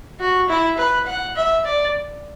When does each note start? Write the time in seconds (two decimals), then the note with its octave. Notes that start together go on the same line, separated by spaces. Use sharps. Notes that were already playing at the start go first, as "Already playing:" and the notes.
0.20 F#4
0.49 E4
0.78 B4
1.06 F#5
1.36 E5
1.65 D5